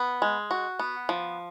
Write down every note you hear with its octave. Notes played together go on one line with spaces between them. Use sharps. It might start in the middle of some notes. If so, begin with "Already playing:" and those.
Already playing: B3
G#3
F#4
B3
F3